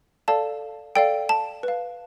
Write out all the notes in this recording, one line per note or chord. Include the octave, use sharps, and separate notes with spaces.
A4 D5 F5 A5
A4 D5 F5 G5
A5
B4 F5